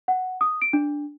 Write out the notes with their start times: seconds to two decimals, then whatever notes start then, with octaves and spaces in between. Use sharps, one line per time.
0.08 F#5
0.41 D#6
0.62 D7
0.73 D4